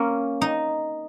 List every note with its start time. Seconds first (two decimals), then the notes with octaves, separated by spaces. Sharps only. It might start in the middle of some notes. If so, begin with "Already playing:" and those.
Already playing: A#3 C#4
0.41 D#4